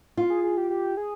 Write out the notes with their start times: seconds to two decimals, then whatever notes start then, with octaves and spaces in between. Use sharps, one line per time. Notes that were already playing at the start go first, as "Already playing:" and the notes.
0.17 F4
0.30 G#4
0.43 G#4
0.58 G4
0.70 G4
0.97 G#4